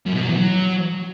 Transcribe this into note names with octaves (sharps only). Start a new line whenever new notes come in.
F#2
B2
F#3
E3
F#3